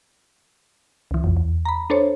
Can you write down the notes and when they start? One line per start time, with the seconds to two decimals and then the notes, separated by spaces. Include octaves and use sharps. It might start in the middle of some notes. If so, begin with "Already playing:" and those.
1.11 C#2 E3
1.24 A#1 F2
1.37 E2
1.65 A#5 B5
1.90 D4 A4 C5 C#5